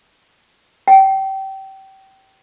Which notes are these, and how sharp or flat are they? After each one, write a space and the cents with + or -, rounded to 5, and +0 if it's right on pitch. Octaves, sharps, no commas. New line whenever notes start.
G5 -25